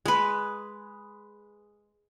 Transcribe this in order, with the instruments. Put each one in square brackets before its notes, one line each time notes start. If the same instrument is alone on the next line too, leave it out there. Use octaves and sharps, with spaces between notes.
[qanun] G#3 B4